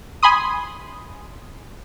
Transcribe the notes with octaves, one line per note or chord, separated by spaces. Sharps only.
G#5 B5 C6 D#6